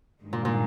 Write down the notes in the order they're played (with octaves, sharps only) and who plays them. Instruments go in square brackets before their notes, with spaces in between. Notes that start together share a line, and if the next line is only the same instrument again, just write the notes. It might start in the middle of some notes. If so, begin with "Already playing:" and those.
[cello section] G2 D#3 G#3
[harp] A#2
A#2